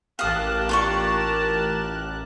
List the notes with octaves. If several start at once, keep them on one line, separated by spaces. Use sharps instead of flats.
A1 G4 A#4 F5 A5 D#6 F#6
F4 D5 C#6